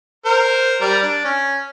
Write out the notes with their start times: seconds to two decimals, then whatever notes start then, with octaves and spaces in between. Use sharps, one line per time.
0.26 A#4 C5
0.81 G3 A#4 D5
1.03 D4
1.25 C#4